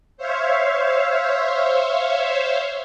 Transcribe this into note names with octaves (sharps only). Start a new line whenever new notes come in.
C5 C#5 E5 F5